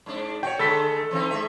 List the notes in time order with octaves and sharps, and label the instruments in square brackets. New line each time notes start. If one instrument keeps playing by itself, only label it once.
[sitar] G#2 D4
[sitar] F#4 [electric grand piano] C#5 G5
[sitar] D3 G#3 A3 [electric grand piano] A4 B5 B6
[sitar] E3 C4 D#4
A2 G#3 E5